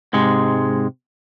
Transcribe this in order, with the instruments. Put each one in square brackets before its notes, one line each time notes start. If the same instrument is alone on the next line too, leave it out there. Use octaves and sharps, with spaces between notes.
[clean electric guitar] G#2 C3 G#3